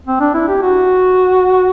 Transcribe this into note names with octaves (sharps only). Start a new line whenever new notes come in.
C4
D4
E4
G4
F#4